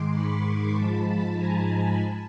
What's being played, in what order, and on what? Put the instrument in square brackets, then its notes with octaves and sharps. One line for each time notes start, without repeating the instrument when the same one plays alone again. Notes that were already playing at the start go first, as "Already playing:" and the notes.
Already playing: [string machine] G#2 D#3 G#3 C6 D6
B5 C#6
G#2 F3 G#3 A5 B5
G#5 A#5
A5